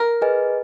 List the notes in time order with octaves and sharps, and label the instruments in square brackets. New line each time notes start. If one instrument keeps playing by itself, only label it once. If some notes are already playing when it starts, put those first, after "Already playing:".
Already playing: [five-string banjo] A#4
[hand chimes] G#4 B4 D#5 G#5